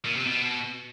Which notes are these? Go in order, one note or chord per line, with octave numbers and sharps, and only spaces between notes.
A#2
C3
B2